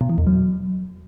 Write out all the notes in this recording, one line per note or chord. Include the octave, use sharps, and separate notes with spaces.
B2
E3
E2
F#3